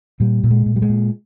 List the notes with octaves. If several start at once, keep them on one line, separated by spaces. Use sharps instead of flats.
A#2 G3
A#2
G#3
A#2
G3
G#3
A#2